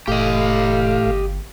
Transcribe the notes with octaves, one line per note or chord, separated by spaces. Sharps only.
F1 A2 G4 D#5 F5
G1